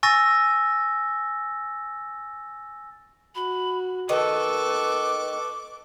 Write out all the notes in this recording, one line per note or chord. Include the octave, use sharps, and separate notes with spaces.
G#5 C#6 E6 A6 A#6
F#4 B5
D#3 A4 B4 C#6 D6